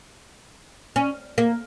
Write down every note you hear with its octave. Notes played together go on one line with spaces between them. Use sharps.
C#4
A#3